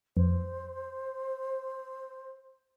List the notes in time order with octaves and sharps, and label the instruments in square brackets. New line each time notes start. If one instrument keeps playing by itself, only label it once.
[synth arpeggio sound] F2 [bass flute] C5